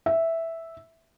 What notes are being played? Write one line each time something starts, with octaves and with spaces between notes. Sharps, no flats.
E5